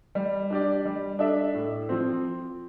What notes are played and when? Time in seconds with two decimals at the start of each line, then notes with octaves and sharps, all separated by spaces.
0.15 G3
0.50 D4 G4 D5
0.85 G3
1.19 D4 A4 E5
1.54 A2
1.89 F3 C4